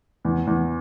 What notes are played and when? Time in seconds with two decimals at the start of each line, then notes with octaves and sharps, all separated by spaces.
0.25 E2
0.47 E2